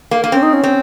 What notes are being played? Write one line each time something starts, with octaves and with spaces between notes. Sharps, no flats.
A#3
A#3
C4 C#4
D#4
C#4
C4